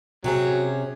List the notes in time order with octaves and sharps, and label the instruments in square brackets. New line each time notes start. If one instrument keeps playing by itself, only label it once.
[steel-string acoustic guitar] C3 C#4 G#4 [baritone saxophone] F#3